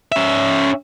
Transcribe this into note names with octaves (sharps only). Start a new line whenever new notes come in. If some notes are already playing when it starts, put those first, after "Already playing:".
C#4 E5